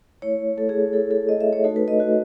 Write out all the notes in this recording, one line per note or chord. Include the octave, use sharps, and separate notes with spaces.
A3 E4 C#5
A3 E4 A4
G#4
A3 E4 A4
A4
A3 E4 D#5
E5
C#5
A3 D#4 F#4 A4
B4
D#5
A3 D#4 F#4